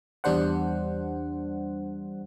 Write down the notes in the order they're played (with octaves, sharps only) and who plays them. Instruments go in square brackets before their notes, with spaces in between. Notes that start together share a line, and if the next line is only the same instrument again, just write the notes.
[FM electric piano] E2 G3 D4 C5 F#5